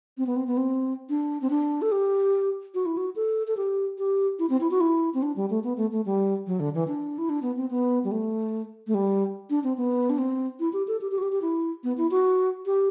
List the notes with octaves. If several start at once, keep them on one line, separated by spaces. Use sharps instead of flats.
C4
B3
C4
B3
C4
D4
C4
D4
A4
G4
F#4
E4
F#4
A4
A4
G4
G4
E4
C4
E4
F#4
E4
C4
D4
G3
A3
B3
A3
A3
G3
F#3
D3
E3
D4
E4
D4
B3
C4
B3
G3
A3
A3
G3
D4
C4
B3
D4
C4
E4
G4
A4
G4
G4
F#4
G4
G4
E4
B3
E4
F#4
G4